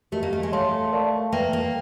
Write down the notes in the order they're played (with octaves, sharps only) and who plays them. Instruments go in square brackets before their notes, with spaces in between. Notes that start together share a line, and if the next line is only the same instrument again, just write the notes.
[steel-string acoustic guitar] A3 [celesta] G4 A#4 D#5
[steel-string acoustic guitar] A#3
A3
G#3
[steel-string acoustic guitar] A3 [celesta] C#5 F5 A5 C6
[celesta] A#4 D5 F5 A5 C#6
[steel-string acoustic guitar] A#3 [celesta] B4 E5 G5
[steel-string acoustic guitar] A#3